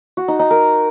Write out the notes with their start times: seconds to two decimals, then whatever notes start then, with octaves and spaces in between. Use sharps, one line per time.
0.17 F#4
0.28 D#4
0.39 D#4
0.51 A#4